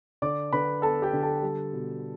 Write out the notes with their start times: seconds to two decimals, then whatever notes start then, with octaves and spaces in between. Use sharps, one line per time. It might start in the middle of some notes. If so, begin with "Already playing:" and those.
0.22 D3 D5 D6
0.53 D3 B4 B5
0.82 B3 A4 A5
1.02 G4 G5
1.13 D3
1.22 A4 A5
1.42 G3
1.73 B2